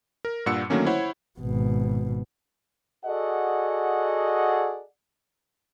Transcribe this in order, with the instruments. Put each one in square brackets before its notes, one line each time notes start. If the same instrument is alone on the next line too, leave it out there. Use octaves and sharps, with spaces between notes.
[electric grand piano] A#4
G2 A#2 F#5 E6 C#7
D3 D#3 F#3 A3 A#3 C#4
E4 C5 C#5 F#5
[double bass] G#1 B2
[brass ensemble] F#4 G#4 A4 D5 D#5 F#5